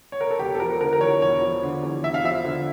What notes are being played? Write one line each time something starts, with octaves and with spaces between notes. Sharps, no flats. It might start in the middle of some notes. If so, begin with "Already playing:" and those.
C#5
A#4
A4
E1 G4
A4
F3 A#4
D3 A#4
A#4
E2 C#5
E1 C#5
F3
D3
E2
E1 E5
F5
F3 E5
D3